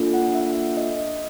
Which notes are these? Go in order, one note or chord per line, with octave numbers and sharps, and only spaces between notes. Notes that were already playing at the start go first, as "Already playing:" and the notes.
Already playing: A#3 D4 F4 A4
F#5
E5
D#5